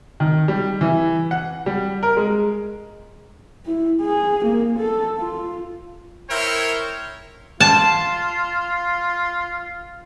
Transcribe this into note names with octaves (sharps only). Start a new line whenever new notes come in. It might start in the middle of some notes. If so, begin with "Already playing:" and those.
D#3
G3
E3
F#5
G3
A#4
G#3
E4
G#4
A#3
A4
F4
E4 A#4 C5 C#5 G5
F4 A5